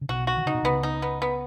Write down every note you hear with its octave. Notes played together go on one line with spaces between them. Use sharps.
C#3
B1 B2 F#4
F#4
D#3
C#3 D#4
B2
C#2 C#3 B3
D#4
B3
B3